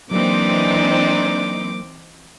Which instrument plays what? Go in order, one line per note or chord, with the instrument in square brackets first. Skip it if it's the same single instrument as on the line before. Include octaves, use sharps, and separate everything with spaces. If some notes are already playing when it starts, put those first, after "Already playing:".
[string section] E3 C4 D#4 [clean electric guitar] F#3 A#3 [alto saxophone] D4 [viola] D6